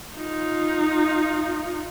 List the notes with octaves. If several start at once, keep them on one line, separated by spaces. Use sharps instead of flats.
D#4 F4